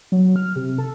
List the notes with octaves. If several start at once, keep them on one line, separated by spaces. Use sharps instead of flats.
F#3
F6
C3
A4